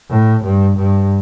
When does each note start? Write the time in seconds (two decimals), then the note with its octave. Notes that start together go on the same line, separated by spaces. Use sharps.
0.10 A2
0.44 G2
0.77 G2